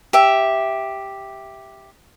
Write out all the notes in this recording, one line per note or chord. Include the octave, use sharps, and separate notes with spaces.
G4 E5